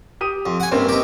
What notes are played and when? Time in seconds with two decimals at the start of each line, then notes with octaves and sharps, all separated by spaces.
0.21 G4 D#6 D#7
0.46 F2
0.60 F#5 G#5
0.72 G2 C3 A#3 C4 C#4
0.89 D#4 G4